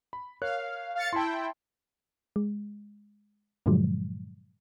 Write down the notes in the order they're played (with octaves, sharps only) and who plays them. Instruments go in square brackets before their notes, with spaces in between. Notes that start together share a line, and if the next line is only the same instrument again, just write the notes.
[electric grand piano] B5
[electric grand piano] A#4 C#5 F#6 [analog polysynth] F5
[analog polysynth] F5 A6 C#7
[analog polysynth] E4 G5 [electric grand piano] A5 C6
[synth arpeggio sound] G#3
G2 A#2 D3 F3 F#3 G#3